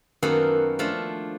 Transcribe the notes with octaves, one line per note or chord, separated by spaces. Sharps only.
F#2 D#3 A#3 B3 F#4 A4
F3 A3 D4 F4